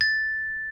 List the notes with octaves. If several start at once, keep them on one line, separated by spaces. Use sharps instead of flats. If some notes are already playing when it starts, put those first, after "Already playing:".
A6